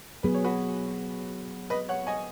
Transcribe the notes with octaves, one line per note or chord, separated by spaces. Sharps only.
F#3 B3 G#4 B4
C#5
F#4 B4
B4 D#5
C#5 F#5
D#5 G#5